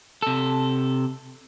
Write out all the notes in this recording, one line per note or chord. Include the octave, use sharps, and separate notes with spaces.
C3 A4